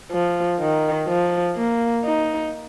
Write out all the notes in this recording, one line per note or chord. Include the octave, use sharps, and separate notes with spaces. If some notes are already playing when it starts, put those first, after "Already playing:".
F3
D#3
F3
A#3
D#4